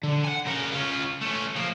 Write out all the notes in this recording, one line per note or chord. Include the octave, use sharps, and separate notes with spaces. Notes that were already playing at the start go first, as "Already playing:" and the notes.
D3
F#5 G#5
C#3 A#4
C#4 F4
A3 C#4
F3 A#3